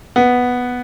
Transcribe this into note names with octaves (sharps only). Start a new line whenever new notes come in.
B3